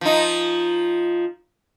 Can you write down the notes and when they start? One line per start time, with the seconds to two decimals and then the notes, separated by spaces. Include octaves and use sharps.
0.01 F3 D#4